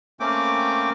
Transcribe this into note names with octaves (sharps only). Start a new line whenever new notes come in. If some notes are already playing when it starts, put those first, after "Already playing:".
A3 A#3 C4 C#4 G5 D6